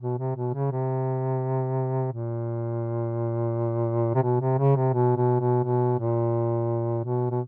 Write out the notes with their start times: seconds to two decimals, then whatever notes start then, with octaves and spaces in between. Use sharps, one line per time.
0.01 B2
0.18 C3
0.36 B2
0.54 C#3
0.72 C3
2.12 A#2
4.15 C3
4.23 B2
4.41 C3
4.59 C#3
4.76 C3
4.94 B2
5.17 B2
5.40 B2
5.64 B2
5.99 A#2
7.05 B2
7.31 B2